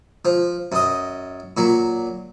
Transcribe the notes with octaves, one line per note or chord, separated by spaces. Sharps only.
F3
F#2 D#5
A#2 F#3